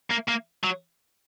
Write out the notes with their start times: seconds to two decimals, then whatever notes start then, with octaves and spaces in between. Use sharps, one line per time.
0.10 A#3
0.28 A#3
0.64 F#3